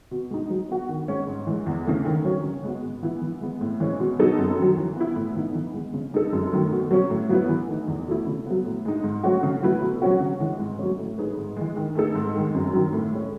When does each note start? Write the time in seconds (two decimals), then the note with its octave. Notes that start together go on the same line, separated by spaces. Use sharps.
0.11 B2
0.30 G#3 D#4
0.50 F#3
0.69 B3 F#4
0.88 D#3
1.08 G#3 C#4
1.27 G#2
1.47 E3 G#3
1.66 E2
1.86 C#3 E3 A3
2.05 D#3
2.25 F#3 C#4
2.44 C#3
2.63 G#3 B3 F#4
2.83 G#2
3.02 E3 B3 E4
3.22 E3
3.41 G#3 B3
3.61 A2
3.80 E3 G#3 C#4
4.00 B2
4.19 F#3 B3 D#4 A4
4.38 F#2
4.58 D#3 F#3
4.77 E3
4.96 B3 E4
5.16 A2
5.35 E3 B3 D#4
5.55 E3
5.74 G#3 B3
5.94 C#3
6.13 G#3 D#4 A4
6.33 F#2
6.52 D#3 F#3 A3
6.71 B2
6.91 F#3 C#4
7.10 A2
7.29 F#3 B3 E4 B4
7.49 E3
7.69 A3 D#4
7.88 E2
8.07 B2 A3 E4
8.27 C#3
8.46 F#3 B3
8.65 A2
8.85 G#3 D#4
9.04 G#2
9.24 F#3 A3 C#4 F#4
9.43 C#3
9.63 F#3 A3 E4 B4
9.82 B2
10.02 F#3 C#4 F#4
10.20 C#3
10.40 E3 G#3
10.60 G#2
10.79 F#3 A3 C#4
10.98 A2
11.18 G#3 D#4 G#4 B4
11.37 G#2
11.57 E3 G#3
11.76 D#3
11.95 A3 D#4 A4
12.15 G#2
12.35 D#3 G#3
12.54 F#2
12.73 D#3 F#3
12.93 A2
13.12 G#3 C#4